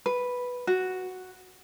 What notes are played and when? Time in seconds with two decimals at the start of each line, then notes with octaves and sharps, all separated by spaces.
0.06 B4
0.67 F#4